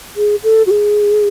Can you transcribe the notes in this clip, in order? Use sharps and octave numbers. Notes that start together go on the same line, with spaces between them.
G#4
A4
F#4
G#4